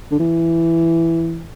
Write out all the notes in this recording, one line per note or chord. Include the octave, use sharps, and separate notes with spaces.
D3
E3